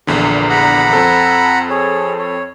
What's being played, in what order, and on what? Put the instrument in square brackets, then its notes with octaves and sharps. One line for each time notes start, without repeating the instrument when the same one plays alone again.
[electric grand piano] A#1 E2 D3 [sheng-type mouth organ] G4
[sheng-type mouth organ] F#5 A#5 B5
[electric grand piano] F2 C4 A4
[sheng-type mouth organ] G#4 C#5
C#5